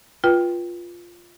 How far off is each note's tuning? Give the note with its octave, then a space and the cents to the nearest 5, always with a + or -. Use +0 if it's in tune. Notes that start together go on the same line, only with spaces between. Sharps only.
F4 +0 B4 -20 G5 +0